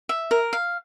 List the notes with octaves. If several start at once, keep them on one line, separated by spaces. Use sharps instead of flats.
E5
A#4
F5